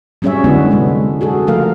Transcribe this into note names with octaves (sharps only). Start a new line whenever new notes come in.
F#3 G3 C#4 G#4 C#5 E5
D3 G#3 B3 D4 E4
C3 G3 G#3
F#4 G#4 A4
C#3 F3 A3 A#4 F5